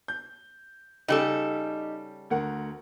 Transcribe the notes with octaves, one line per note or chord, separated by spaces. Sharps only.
G6
C#3 G3 D#4 G4 A4
D2 A#4 F#5